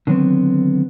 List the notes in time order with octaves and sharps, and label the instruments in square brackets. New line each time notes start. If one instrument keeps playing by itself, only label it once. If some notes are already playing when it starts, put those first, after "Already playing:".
[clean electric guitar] D3 D#3 F#3 B3 C4